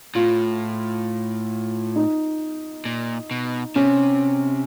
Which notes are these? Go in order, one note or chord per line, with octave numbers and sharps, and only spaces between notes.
A2 F4
D#4
A#2
B2
C3 C#4